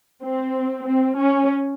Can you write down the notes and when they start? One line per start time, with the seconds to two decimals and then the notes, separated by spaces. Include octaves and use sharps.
0.23 C4
0.85 C4
1.15 C#4